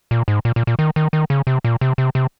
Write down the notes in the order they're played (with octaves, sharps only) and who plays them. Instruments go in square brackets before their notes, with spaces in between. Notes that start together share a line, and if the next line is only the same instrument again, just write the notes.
[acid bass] A#2
G#2
A#2
A#2
A#2
D#3
D#3
D#3
C#3
C3
A#2
C3
C3
C3